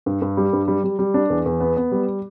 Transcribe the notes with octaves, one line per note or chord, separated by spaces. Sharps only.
G2
G2
G3
G2
G3
G3
G3
D4
E2
E2
B3
B3
G3